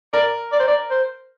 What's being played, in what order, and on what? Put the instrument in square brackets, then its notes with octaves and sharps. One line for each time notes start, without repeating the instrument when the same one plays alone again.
[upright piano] A#4 [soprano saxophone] D5
[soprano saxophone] D5
C5
D5
C5